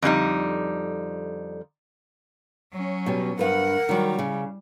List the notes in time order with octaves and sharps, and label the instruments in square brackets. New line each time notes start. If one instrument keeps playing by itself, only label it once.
[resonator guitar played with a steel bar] F2 D3 G3 D#4
[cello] F#3 C#4
[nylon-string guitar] B2 G3
[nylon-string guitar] G2 B4 [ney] A#4 [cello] F#5
[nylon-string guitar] D#3 F#3 [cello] G3
[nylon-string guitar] C#3